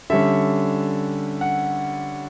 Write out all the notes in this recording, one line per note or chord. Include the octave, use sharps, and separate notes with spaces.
D3 G3 C#4 E5
F#5